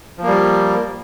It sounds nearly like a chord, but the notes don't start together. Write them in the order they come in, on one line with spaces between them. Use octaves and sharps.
F3 A#3 G3